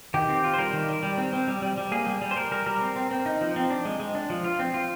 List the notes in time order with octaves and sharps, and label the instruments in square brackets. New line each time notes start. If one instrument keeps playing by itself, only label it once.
[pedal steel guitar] D#3 G4
C4
F4
C5
G3 A#4
D#3
G3
G3
C4
C4
G3
G3
G3
A#3 G#4
G3
G3
C5
G3 A#4
G3 A#4
G3 A#4
C4
C4
C4
D#4
F3
C4
D4
G#3
G#3
D4
F3
F4
C4
F4